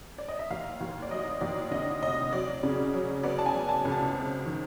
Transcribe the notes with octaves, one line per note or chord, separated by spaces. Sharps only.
D5
D#5
E5
D#2 F5
D#2
D5
F#3 D#5
D#2 D5
D3 D#5
F1 D#5
F#3 D5
C#3
F#3
B3 D5
A5
G#5
F#3
A5
C#2
A5
C4
D#3